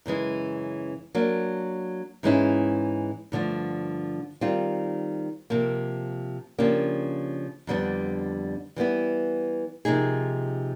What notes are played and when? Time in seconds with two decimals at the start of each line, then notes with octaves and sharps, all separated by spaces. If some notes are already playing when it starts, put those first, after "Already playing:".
0.06 F#2 C#3 E3 G#3
1.15 F#3 A#3 D4
2.23 G#2 E3 G#3 C#4 E4
3.32 G2 D3 F3 A3
4.41 D#3 G3 C4 F4
5.50 C3 F3 A#3
6.58 C#3 F3 A#3 D4 G4
7.67 F2 D3 G3 B3 D4
8.76 E3 G3 B3 E4
9.85 C3 F3 A#3 D#4 G#4